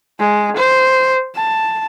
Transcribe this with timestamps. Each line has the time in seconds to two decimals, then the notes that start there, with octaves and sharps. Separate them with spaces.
0.19 G#3
0.57 C5
1.36 A5